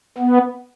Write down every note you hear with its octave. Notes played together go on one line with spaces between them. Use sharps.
B3